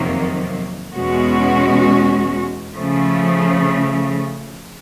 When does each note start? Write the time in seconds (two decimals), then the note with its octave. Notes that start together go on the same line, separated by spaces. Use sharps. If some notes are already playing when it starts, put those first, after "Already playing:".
Already playing: F2 C3 D#3 F#3 A#3
0.93 E2 B2 G#3 C#4 F#4
2.74 C#3 F3 A3